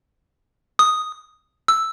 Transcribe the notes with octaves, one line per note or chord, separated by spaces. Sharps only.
D#6
E6